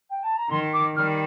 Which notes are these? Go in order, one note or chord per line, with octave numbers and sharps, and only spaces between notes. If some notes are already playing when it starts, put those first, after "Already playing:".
G5
A5
A#5
D#3 C6
D6
D#3 G3 F6